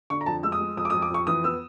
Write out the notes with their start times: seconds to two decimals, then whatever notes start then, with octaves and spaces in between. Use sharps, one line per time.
0.10 D3 C#6
0.21 A#5
0.26 F2 A5
0.43 G#3 E6
0.52 D#6
0.60 G#3
0.77 F2 D#6
0.85 D6
0.90 D#6
0.94 F2
1.02 D6
1.10 F2 C#6
1.27 E3 D#6
1.44 B3 E6